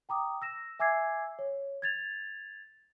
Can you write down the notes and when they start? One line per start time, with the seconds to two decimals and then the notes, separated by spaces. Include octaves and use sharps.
0.09 G5 A#5 D6 D#6
0.42 E6 A#6 E7
0.79 E5 G#5 D6 E6 G#6 C7
1.39 C#5
1.82 G#6 A6 F7